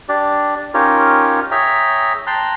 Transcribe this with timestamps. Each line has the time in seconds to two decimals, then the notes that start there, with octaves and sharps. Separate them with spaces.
0.09 D4 G4 D5
0.74 C#4 D#4 F4 G4 A#4 C#5
1.51 G#4 C#5 E5 G5 A#5
2.27 G5 A5 A#5 C6 F#6